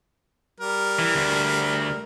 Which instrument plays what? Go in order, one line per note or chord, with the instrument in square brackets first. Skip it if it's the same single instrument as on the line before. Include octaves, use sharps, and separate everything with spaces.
[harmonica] G3 A#4
[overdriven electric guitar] E3
D2